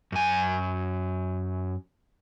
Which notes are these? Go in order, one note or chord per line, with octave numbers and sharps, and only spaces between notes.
F#2 G#5